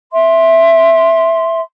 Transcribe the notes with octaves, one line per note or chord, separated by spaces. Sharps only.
E5 C6